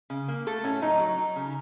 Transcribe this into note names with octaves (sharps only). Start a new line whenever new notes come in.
C#3
A#3
A3 A4
A2 C#4
F#3 D#4
F#3
F#3
C#3